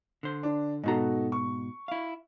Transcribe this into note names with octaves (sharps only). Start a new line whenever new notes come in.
D3 C5
D4
G#2 B2 D#4 F#4 A4 A#5
C#6
E4 F5